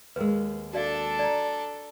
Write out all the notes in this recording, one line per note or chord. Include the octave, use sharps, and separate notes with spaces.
D#2 G#3 A#4 B4
D4 F#4 A4 D5 F5
D5 A#5